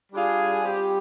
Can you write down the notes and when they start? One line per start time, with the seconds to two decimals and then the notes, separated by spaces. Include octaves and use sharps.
0.12 G3 D4 F4 G#4
0.62 G3 C4 G4